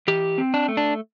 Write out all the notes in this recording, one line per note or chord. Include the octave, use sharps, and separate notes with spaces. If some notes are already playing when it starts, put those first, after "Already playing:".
E3 G4
C4
D4
A3
D4